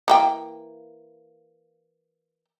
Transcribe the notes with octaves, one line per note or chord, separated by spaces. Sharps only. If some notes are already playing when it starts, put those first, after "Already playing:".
E3 A#3 G5